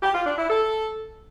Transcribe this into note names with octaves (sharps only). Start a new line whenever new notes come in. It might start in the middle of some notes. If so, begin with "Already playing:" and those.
G4
F4
D4
E4
A4